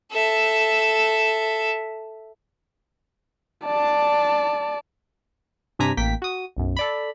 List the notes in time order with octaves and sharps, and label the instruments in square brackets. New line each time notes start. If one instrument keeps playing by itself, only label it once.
[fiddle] A4 E5
[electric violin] D5 A5
[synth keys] G2 C3 D4 G#5 A#5 B6
A1 A#3 G5 B6
F#4 D#6
B1 F#2
A4 D5 B5